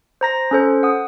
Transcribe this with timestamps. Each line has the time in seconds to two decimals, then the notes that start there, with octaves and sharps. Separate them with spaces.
0.21 C5 A#5 A#6
0.51 C#4 A4 C5
0.83 F#5 D#6